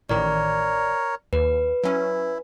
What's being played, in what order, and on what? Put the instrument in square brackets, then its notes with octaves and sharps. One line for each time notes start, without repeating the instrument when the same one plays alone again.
[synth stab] A1 A2 D#3 [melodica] A#4 C#5 [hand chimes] D5
[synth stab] D#2 [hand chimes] B4
[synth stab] F#3 C#4 [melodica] E4